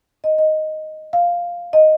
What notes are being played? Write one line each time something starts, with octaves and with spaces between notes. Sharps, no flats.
D#5
D#5
F5
D#5